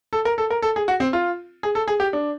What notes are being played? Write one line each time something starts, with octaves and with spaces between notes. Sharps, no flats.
A4
A#4
A4
A#4
A4
G#4
F#4
C4
F4
G#4
A4
G#4
G4
D4